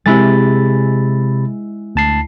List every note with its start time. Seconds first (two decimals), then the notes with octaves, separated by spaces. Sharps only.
0.06 C3 G#3 E4 B5 A6
1.95 D2 A5 C7